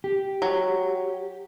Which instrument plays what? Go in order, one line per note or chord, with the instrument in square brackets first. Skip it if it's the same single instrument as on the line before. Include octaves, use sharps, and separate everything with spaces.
[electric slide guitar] G4
[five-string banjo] F#3